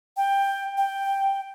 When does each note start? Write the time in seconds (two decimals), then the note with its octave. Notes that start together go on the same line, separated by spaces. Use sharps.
0.17 G5
0.77 G5